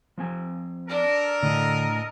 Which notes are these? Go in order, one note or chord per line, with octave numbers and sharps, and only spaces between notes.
F3 C4 G#5
D4 A4 A#4
A2 D3 D#5